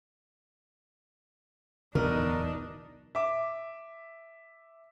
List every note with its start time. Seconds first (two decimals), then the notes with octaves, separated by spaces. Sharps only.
1.95 D1 B1 E2 B2 D4 D#4 A#4
3.15 E5 D6